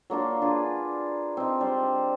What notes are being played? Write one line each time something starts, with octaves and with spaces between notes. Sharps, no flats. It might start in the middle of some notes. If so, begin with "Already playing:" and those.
F#3 A#3 D4 F4
D4 F4 G#4 B4
C4 D#4
G3 D4 C5